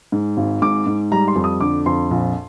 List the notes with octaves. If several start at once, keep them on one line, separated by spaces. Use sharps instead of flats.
G#2
G#1
G#2 D6
G#2
G3 A#5
C6
F2
D#6
D3 D6
F2 C6
A#1